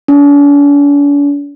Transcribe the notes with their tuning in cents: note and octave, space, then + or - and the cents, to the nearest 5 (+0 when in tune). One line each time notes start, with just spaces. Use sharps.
D4 -45